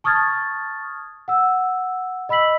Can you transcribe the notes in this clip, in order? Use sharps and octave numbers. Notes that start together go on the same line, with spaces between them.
A5 C#6 D#6 F6 G#6 A6
F#5 E6
D#5 B5 E6 B6 F#7